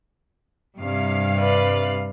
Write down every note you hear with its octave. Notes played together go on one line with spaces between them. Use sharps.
G2 C3 F5
B4 D5